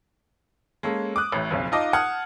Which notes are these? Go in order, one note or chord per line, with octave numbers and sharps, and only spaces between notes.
G#3 A#3 C#4 A4
D6 D#6 F#6
A1 A2
F#1 B1 F2
D#4 F4 D#5 A5 D6
F#5 A5 D#6 F6 G#6